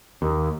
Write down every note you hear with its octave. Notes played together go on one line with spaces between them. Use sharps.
D#2